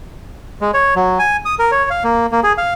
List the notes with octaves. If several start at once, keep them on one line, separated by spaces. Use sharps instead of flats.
G#3
C#5
F#3
G#5
D#6
A#4
C#5
F5
A#3
A#3
G#4
F5